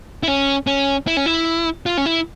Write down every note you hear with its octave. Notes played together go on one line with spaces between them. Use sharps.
E4
C#4
C#4
E4
C#4
E4
F4
C#4
E4